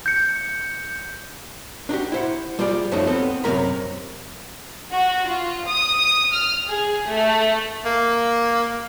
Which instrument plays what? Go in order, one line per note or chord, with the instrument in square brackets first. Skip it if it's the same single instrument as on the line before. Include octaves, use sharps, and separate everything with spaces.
[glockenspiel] G6 C#7
[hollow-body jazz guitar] D4 D#4 F#4 G4
E4 C5 F#5
G3 F4 G#4 D5
F#2 F3 F#3 A3 D#4
B3 C4 A4
F#2 C3 F#3 G#3 A#4 B5
[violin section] F#4
F4
D#6
F6
G#4
A3
[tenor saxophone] A#3